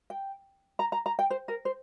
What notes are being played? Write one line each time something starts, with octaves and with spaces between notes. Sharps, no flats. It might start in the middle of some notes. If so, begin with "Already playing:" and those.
G5
A#5
A#5
A#5
G5
C5
A#4
C5